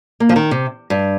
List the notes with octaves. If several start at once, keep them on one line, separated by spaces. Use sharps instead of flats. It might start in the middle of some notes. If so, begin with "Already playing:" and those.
A#3
F3
D#3
C3
G2